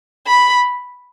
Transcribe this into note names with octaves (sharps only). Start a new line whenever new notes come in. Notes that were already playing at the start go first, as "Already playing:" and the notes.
B5